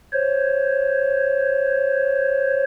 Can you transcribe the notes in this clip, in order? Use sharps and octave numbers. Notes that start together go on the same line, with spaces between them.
C5 C#5